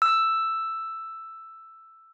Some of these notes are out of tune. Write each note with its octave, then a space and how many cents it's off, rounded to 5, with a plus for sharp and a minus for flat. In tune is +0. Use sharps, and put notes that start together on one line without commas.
E6 +5